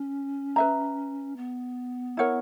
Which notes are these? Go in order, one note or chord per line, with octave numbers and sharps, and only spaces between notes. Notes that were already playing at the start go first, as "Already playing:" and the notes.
Already playing: C#4
B4 E5 A#5
B3
E4 A#4 C#5 F#5